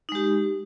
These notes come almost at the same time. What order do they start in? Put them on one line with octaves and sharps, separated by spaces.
D#4 G#3 G4